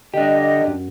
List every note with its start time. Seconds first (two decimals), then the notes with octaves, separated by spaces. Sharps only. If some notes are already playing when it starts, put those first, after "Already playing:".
0.14 D3 D4 G4 D#5
0.67 F#2